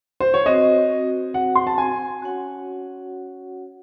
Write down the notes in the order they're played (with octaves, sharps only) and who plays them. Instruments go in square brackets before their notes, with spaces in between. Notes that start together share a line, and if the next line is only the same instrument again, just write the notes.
[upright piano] C5
C#5
[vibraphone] C4 F#4 C5 [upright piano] D#5
[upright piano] F#5
C6
A5
G#5
[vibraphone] C#4 F#4 C#5 F#5